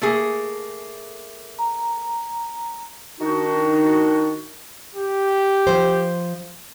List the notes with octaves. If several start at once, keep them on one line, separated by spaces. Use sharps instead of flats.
A3 A#3 G#4
A#5
D#3 D4 D#4 F#4
G4
F3 C5